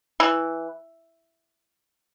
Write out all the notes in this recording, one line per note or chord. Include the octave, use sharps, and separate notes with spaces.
E3